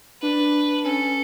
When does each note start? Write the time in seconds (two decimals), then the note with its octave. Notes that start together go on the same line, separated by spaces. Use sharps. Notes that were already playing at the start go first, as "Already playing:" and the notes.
0.22 D4 B4
0.85 C#4 A4